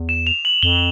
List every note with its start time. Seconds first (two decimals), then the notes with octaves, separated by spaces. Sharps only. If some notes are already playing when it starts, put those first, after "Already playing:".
Already playing: E2
0.09 E7
0.27 F7
0.45 F#7
0.63 F2 G7